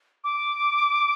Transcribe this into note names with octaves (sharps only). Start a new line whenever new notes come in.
D6